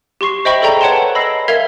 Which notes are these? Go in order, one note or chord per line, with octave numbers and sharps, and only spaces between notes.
G4 C6 C#6 C7
C5 D#5 E5 G5 B5 C#6
G#4 A4 D5 G5 A#5
B4 C#5 F#5 G5 A5 C6
D#5 B5 E6 A#6 C7
A#4 E5 F5 G#6 F7